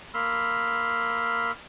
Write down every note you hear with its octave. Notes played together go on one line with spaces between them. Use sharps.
A#3 B5 C6 E6 F6